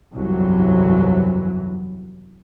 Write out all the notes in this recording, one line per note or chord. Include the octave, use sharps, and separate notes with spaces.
G1 C2 F2 E3 F#3